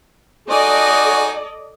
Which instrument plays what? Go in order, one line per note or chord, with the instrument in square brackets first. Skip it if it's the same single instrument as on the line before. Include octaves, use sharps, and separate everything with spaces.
[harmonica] D#4 F#4 G#5 [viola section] A4 D5 D#5